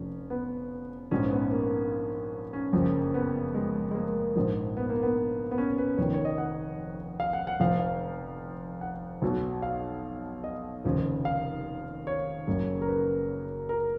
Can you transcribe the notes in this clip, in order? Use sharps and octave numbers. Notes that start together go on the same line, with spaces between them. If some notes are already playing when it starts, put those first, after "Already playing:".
Already playing: F1 F3 C#4
B3
A#1 G#2 F3 C#4
B3
A#3
C#4
F#1 F2 F3
B3
G#3
G#3
A#3
A#1 G#2 F3
B3
A#3
B3
B3
C#4
B4
F1 F2 D#3 C#5
C#5
D#5
F#5
F5
F#5
F#5
F1 F2 F3 F5
F5
F#5
B1 B2
F5
D#5
F1 D#2 C#3 F3
F5
C#5
F#1 F#2 C#3
A#4
B4
A#4